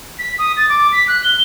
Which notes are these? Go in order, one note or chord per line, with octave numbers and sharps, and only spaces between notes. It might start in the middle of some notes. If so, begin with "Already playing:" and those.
B6
D#6
A6
D6
B6
F#6
G7